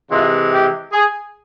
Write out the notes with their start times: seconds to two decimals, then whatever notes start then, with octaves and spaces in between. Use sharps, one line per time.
0.11 C3 E3 G#3 F4
0.51 G4
0.92 G#4